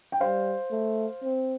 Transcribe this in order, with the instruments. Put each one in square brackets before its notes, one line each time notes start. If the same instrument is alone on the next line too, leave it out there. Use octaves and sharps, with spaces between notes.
[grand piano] G5
[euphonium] G3 [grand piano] C5 F5
[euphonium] A3
C4